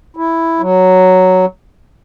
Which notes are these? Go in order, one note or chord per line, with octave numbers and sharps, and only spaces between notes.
E4
F#3